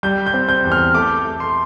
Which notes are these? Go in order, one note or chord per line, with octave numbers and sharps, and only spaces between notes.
G3 G6
G6
C4
G6
E2
F6
A3 D6
A3
C6